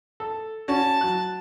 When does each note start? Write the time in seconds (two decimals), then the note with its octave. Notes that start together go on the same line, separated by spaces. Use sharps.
0.20 A4
0.68 C#4 F#4 A5
1.01 F#3 F#6